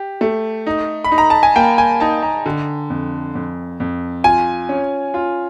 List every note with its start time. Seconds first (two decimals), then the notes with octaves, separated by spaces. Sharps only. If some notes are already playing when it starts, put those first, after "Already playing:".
Already playing: G4
0.21 A3
0.67 D#4
1.04 B5
1.12 D#4
1.18 A#5
1.30 A5
1.43 G#5
1.56 A#3 G5
1.78 G#5
2.00 D#4 A5
2.23 A#5
2.46 D3
2.90 F2
3.35 F2
3.80 F2
4.24 F4 G#5
4.69 C#4
5.14 F4